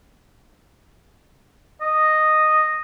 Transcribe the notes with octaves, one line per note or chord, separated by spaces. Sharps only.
D#5